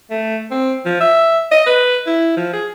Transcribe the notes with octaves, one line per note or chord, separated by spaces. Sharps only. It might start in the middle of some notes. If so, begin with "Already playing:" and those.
A3
C4
F3
E5
D#5
B4
E4
F3
G#4